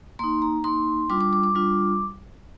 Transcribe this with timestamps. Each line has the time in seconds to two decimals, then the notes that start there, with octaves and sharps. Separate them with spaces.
0.19 A#3 D#4 C6
0.42 A#5
0.64 A#3 D#4 C6
1.10 G3 D4 F4 D6
1.21 D6
1.33 D6
1.43 D6
1.55 G3 D4 F4